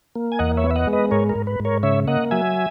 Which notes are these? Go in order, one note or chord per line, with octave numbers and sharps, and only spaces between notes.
A#3
G#5
E2 D#5 F#5
C#5 E5
B3
E5
D#5 F#5
G#3
B4 D#5
G#2 A#4 C#5
A#4
G#2
B4
G#2
A#4 C#5
C#3 C#5 E5
A#3 D#5 F#5
F#3 E5 G#5